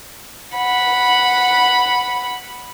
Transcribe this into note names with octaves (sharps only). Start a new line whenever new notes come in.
F#5 B5